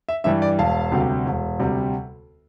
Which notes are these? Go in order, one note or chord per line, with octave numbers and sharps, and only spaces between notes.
E5
G2 E3 G3 E5
D5
E1 F5 A5
D2 C3 G3
E1
D2 C3 G3